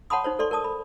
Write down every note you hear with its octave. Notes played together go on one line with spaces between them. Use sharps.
C#5 F#5 A5 B5 C6 D#6
D#4 C5 C#5
A4 D5 C6 C#6
A#4 D5 A5 D#6
B5